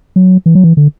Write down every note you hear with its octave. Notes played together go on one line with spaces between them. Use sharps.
F#3
E3
F#3
E3
D3